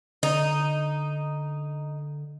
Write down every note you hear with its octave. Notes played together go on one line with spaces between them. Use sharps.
D3 D#4